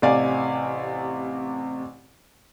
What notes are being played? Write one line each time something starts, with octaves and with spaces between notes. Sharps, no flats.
A1 C3 D5 F5 G#5